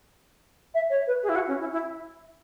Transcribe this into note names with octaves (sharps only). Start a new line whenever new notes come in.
E5
C#5
B4
G#4
E4
F#4
C#4
E4
E4